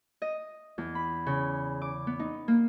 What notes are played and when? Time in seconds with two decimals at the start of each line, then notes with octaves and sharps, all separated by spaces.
0.22 D#5
0.78 E2
0.95 B5
1.26 C#3
1.82 D6
2.07 B3
2.19 D#4
2.48 A#3